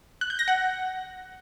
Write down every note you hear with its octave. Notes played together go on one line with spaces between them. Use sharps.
F#6
G6
A#6
F#5